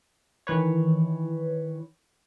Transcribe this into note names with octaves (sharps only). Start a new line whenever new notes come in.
D#3 E3 B4 C#5